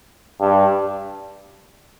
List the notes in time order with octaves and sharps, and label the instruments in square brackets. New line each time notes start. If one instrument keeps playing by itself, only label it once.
[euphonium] G2